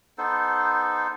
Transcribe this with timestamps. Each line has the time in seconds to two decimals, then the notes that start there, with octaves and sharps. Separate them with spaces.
0.18 B3 D#4 A4 C5